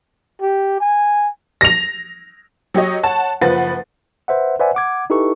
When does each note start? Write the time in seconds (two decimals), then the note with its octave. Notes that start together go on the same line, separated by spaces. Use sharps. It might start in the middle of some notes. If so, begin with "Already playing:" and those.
0.41 G4
0.81 G#5
1.61 A#6 F7
2.74 F#3 G4 C#5 D#5
3.03 C#5 F#5 A5
3.41 F#1 F3 B4 F#5 A6
4.28 B4 C5 E5 F#5
4.60 B4 C5 D5 E5 F#5 G#5
4.75 F#5 D6 G#6
5.10 D#4 E4 G4 A4 B4 C#6